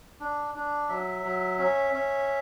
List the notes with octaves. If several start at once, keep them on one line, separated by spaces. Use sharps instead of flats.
D4
D4
F#3 E5
F#3
C#4
C#4